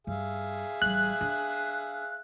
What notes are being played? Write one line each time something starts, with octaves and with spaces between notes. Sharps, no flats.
G2 G#4 E5 F5
A1 G3 F#6
D4